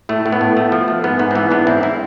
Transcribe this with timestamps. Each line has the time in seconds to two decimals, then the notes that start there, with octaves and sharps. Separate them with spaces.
0.09 A2 A3
0.26 A2
0.32 B3
0.41 A2
0.57 A3
0.72 F3
0.88 A3
1.04 G#2 B3
1.19 G#2 B3
1.31 C4
1.35 E3 B3
1.51 G#2 B3 D4
1.67 G#2 C4 E4
1.83 C4 E4